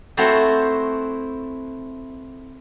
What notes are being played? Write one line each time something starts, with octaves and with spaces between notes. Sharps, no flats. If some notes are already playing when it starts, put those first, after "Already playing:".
A3 C4 E4 F#4 A4 C5